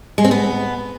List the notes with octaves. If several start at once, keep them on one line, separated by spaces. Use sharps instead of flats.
G#3
C4
B3